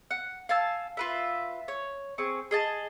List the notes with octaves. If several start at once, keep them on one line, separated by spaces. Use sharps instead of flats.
F#5
F5 G#5 A5 E6
F4 B4 E5
C#5
C4 G#4 C#6
G#4 D#5 A5